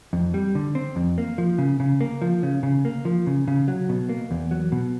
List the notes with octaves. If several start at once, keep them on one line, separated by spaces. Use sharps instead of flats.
F2
G3
D3
C4
F2
A#3
F3
C#3
C#3
A#3
F3
C#3
C#3
A#3
F3
C#3
C#3
F#3
B2
A#3
E2
F#3
B2